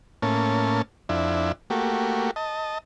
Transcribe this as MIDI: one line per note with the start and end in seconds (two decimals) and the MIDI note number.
0.22 0.82 45
0.22 0.82 58
0.22 0.82 61
0.22 0.82 81
1.09 1.52 41
1.09 1.52 62
1.09 1.52 64
1.70 2.31 57
1.70 2.31 58
1.70 2.31 66
1.70 2.31 67
2.36 2.78 75
2.36 2.78 81